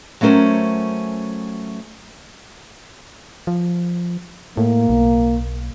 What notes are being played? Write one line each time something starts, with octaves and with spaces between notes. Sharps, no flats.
F#3 A3 C#4 A#4 C5
F3
A2 A#3
B1